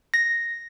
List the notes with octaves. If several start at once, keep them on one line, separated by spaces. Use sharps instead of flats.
A#6